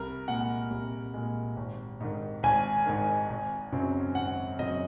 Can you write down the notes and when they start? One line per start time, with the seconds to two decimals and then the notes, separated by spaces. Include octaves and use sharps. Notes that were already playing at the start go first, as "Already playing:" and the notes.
Already playing: C2 A#4
0.28 A#2 G#3 F#5
0.71 C2
1.14 A#2 G#3
1.57 G#1
2.00 G#2 D#3
2.43 G#1 G#5
2.86 G#2 D#3
3.29 G#1
3.72 F#2 C#3 F#3 C4
4.15 G#1 F#5
4.59 F#2 C#3 F#3 C4 D#5